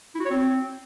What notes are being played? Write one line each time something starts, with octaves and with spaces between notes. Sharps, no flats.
E4
F#4
C#5
C4